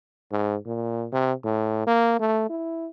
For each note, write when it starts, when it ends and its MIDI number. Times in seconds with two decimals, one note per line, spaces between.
0.31 0.56 44
0.66 1.07 46
1.12 1.33 48
1.44 1.82 45
1.87 2.17 58
2.20 2.46 57
2.49 2.88 64